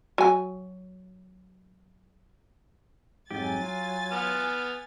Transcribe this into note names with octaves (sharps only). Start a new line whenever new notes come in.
F#3 G#5
F2 G#2 F#3 G4 G#5 A6
F4
B3 F6